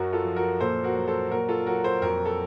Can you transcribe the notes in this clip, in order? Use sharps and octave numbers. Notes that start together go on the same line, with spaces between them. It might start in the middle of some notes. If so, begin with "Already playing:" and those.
Already playing: F#2 F#4 A#4
F4 A4
F3
F#4 A#4
A#2 A4 C5
F#4 A#4
F#3
A4 C5
A#2 F#4 A#4
F4 A4
F#3 F#4 A#4
A4 C5
F2 F#4 A#4
A4